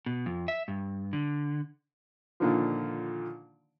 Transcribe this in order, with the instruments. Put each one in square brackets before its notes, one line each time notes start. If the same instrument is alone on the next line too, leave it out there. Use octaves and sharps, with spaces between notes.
[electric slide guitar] B2
F2
E5
G2
D3
[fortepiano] A#2 D3 D#3 F3